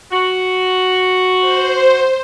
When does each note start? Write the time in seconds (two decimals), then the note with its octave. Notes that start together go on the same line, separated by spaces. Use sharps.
0.12 F#4
1.40 C5